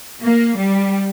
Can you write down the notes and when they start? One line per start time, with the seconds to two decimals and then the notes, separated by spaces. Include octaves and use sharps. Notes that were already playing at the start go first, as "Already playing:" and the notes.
0.22 A#3
0.58 G3